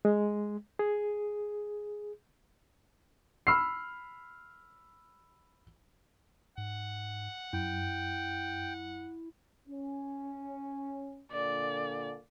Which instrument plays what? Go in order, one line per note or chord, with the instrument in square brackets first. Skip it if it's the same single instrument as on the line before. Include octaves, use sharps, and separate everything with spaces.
[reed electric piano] G#3
G#4
[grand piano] B5 E6 F6 C7
[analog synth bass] G#2 [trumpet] F#5
[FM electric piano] F#2 [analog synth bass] E4 [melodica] G5
[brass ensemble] C#4
[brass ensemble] A#2 D3 [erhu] D5